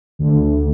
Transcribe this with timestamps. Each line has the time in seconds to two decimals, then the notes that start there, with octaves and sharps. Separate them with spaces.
0.19 D2